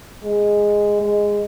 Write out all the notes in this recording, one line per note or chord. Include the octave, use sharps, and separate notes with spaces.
G#3
G#3